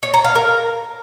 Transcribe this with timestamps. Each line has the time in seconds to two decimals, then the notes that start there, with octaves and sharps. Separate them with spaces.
0.03 C#5
0.14 A#5
0.24 F5
0.35 A#4